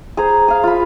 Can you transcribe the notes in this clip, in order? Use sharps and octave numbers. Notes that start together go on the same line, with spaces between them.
G#4 C5 A#5
G#4 F5
F4 B5